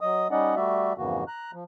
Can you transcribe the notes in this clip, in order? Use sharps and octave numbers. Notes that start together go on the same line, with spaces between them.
F#3 D#5 D#6
G3 C#4 D#4 D5 D#5 F#5
G3 A3 F#4 D5 E5
F2 G#2 C#3 E3 A#3 F#4
A#5 F#6
F3